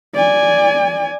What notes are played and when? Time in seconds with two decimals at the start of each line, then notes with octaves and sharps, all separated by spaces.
0.14 D5 G#5